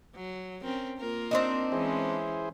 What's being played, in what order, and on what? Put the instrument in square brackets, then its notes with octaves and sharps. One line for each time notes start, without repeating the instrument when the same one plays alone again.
[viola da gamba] F#3
C4 C#4 A#4
A#3 F4 A#4
[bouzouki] C4 D4 D#4
[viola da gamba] E3 G#3 C#4 [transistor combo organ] E4 G#4 C5